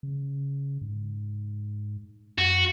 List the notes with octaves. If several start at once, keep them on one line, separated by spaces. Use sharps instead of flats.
C#3
G#2
F#2 F#4